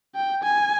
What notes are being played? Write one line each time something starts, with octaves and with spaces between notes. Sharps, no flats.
G5
G#5